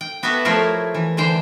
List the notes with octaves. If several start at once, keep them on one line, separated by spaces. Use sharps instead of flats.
G5
B3 F#4 G4 B4 E5 A5
F3 A3 E4 A#4 C5 C#5
E3
D3 E3 C5 G5